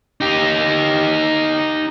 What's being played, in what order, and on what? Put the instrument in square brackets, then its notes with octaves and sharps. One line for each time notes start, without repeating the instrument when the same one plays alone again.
[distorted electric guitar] D#4 G4